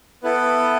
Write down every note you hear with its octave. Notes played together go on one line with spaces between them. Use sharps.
B3 E4 A4 B4